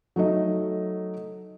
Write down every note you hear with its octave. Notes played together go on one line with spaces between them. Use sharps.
F#3 A3 D#4 D#5